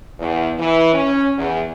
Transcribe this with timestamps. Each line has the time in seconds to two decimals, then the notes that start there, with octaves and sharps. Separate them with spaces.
0.20 E2
0.59 E3
0.93 C#4
1.38 E2